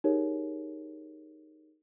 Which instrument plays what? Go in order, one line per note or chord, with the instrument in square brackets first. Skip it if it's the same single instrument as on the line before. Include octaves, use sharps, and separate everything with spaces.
[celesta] D#4 G4 G#4 A#4 C#5